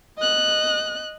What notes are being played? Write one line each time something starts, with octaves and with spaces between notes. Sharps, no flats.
D#5 F#6